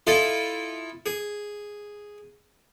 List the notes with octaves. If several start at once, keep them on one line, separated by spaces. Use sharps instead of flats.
E4 F4 A4 D#5
G#4